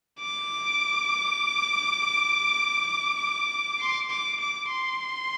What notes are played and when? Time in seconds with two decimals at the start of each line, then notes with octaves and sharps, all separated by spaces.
0.20 D6
3.80 C6
4.09 D6
4.40 D6
4.70 C6